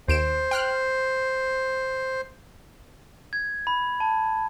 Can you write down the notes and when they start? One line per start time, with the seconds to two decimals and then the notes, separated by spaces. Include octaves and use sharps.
0.08 D#2 C5 D7 E7
0.51 G5 F6 F#6
3.33 G#6
3.67 B5
4.00 A5